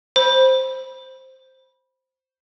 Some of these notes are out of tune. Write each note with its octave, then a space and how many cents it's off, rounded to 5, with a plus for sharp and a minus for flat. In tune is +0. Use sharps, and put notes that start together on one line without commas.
C5 +0 B5 -20